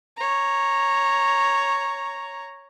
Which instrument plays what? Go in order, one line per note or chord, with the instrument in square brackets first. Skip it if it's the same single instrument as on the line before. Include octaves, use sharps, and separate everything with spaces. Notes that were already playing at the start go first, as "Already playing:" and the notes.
[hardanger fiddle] C#5 A#5